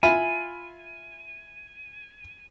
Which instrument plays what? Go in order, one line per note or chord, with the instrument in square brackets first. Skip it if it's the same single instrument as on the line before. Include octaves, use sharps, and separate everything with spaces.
[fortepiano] E4 F4 B5 [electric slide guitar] G#5